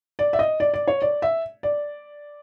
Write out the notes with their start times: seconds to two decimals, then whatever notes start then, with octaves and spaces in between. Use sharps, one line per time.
0.19 D5
0.33 E5
0.39 D#5
0.60 D5
0.74 D5
0.88 C#5
1.02 D5
1.22 E5
1.63 D5